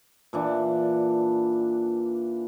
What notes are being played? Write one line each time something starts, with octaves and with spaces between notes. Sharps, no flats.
A#2 E3 D4